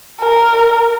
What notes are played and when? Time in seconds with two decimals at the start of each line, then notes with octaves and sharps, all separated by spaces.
0.20 A#4